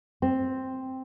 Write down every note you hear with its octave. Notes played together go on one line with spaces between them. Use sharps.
C4